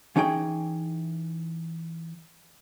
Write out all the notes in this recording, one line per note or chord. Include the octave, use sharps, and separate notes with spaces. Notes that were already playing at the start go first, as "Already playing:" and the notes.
E3 C#4 D#4 G#4 G5